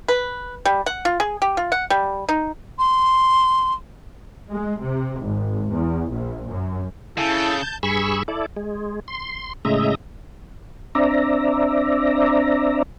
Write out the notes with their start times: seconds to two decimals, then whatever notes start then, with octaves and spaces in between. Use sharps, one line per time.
0.08 B4
0.65 G3
0.86 F#5
1.05 F4
1.20 G#4
1.42 G4
1.57 F4
1.72 F#5
1.90 G3
2.29 D#4
2.79 C6
4.50 G#3
4.79 C3
5.20 G#1
5.71 E2
6.10 A#1
6.48 F#2
7.18 C#3 E4 A4 A5 G6
7.83 G2 G#4 B5 C#6 E6
8.28 E4 A4 D5
8.56 G#3
9.08 C6
9.65 A2 C#3 G#3 D#5 E5 A#5
10.95 C4 D4 D5 E5 A#5